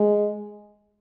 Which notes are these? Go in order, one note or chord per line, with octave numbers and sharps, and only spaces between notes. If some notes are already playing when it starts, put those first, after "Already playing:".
Already playing: G#3